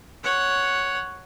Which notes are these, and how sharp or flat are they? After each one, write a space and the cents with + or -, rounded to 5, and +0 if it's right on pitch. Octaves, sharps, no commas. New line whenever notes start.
C#5 +0 F#5 +0